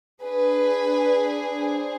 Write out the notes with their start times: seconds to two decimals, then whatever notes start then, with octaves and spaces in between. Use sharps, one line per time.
0.23 D4 G#4 B4
1.57 C5